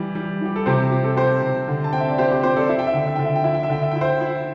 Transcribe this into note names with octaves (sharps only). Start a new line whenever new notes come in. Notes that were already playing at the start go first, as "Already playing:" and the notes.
Already playing: E3 G3
G3
E3 G4
A4
C3 G4 C5
C4 G4
A4
C4 G4 C5
C3
D3
A5
C4 G5
E5
D5
C4 G4 C5
G4 C5
C4 G4 C5
A4 D5
E4 E5
G5
E5
D3 G5
E5
D3 G5
E5
G5
E4 E5
G5
E5
D3 G5
E5
E4 G5
C5 E5
E4